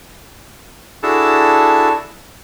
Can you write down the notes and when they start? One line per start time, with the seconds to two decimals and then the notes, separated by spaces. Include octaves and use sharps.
1.03 D4 E4 F#4 G#4 A4 A5